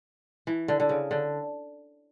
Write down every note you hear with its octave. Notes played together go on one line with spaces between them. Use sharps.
E3
D3
D3
C#3
D3